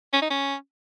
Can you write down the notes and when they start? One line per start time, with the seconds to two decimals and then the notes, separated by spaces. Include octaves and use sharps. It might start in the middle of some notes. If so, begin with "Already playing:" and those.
0.13 C#4
0.22 D#4
0.30 C#4